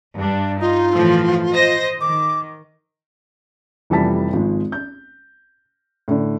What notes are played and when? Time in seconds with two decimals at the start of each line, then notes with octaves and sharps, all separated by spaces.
0.17 G2 D4
0.61 D#4 F4
0.94 A2 E3 F3
1.54 C5 D#5 A#6
2.01 D#3 D6
3.90 F1 E3 F3 G3 A5 B6
4.33 G#1 F3 G#3
4.72 G6
6.08 A2 D3